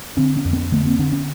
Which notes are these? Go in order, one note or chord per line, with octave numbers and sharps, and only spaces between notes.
D3 C4 D4
B3 C#4
F2
B3 C#4
D3 A3 B3
A#3 C4
D3 C4 D4
B3 C#4